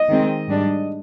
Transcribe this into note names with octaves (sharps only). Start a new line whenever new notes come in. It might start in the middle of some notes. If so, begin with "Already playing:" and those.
Already playing: D#5
D#3 G#3 C4
G#2 G3 D4